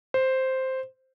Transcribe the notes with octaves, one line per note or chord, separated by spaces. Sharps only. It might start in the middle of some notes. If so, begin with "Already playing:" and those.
C5